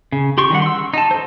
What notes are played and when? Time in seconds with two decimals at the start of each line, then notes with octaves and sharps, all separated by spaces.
0.12 C#3
0.38 G4 C6 C#6
0.50 D#3 G3 F#5
0.62 C6 E6
0.94 D#4 A5
1.11 A4 C5